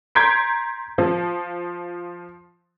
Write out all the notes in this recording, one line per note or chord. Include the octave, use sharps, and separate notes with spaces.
A#5 C6 G6 G#6 B6 D7
F3